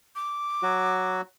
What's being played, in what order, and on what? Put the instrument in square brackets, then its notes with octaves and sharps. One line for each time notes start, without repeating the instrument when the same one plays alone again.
[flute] D6
[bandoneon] F#3 F#4